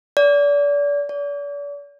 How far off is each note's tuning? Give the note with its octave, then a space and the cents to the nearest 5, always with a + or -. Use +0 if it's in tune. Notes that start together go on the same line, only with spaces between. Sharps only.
D5 -35
D5 -40